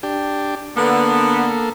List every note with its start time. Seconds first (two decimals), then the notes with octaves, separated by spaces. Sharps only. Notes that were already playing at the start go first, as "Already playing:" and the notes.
0.03 D4 G4
0.77 D3 A#3 B3 A4